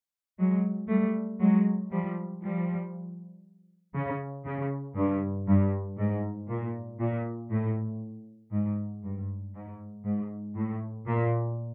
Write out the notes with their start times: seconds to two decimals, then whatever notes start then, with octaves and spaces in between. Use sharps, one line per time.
0.38 F#3 G#3
0.88 G3 A3
1.40 F#3 G#3
1.91 F3 G3
2.41 F3 G3
3.94 C#3
4.45 C#3
4.96 G2
5.47 G2
5.98 G#2
6.48 A#2
6.99 A#2
7.50 A2
8.51 G#2
9.03 G2
9.54 G#2
10.04 G#2
10.55 A2
11.06 A#2